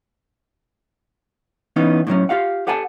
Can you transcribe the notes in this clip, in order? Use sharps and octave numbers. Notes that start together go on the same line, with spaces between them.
E3 B3 C#4 D#4
A2 D3 F#3 C#4
F4 G4 F5 F#5
G4 A4 F#5 G#5 A5